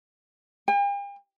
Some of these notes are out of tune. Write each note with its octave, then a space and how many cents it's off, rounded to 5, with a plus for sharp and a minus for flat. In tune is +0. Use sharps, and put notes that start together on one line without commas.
G5 +45